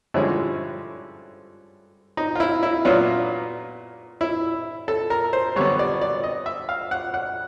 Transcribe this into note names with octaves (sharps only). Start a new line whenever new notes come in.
G2 D3 F3 G#3 C#4 E4
D#4
F4
E4
E4
A#2 F#3 B3 D4 F4
E4
A4
A#4
C5
G2 D3 F#3 B3 C#5
D5
D5
D#5
E5
F5
F#5
F#5